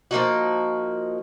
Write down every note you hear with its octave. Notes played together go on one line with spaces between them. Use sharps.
F3 A#3 D#4 F#4